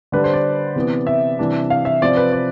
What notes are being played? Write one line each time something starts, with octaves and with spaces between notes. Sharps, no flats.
D3 G3 D4 B4
C5
D5
C3 E3 B3
E5
C3 E3 G3 D4
F5
E5
C3 F3 C4 D5
B4
D5